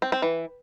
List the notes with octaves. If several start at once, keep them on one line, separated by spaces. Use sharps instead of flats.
C4
C4
E3